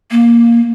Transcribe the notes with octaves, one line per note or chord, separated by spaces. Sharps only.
A#3